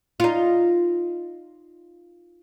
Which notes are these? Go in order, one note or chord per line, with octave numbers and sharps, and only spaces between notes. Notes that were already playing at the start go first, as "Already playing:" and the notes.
D#4 F4